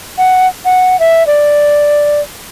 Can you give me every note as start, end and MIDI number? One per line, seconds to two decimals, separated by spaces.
0.18 0.47 78
0.65 0.99 78
1.00 1.26 76
1.27 2.21 74